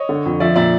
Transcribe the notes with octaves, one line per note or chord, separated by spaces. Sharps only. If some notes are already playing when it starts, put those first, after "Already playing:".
Already playing: C#5 D#5
D3
F2
F3 D5 E5
A#2 D5 E5